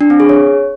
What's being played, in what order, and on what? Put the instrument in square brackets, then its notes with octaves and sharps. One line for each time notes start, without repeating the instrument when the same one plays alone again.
[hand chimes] D4
C4
G#4
C#5